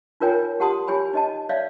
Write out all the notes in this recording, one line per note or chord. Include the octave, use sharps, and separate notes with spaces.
D#4 F4 A#4 C#5 G5 G#5
G4 F#5 A5 C6 D#6
E4 G4 C#5 G#5 B5
D#4 D#5 A5
C#5 D5 E5 F5